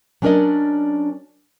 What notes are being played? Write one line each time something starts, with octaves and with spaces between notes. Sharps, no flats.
F#3 C#4 D4 A#4 D5 D#5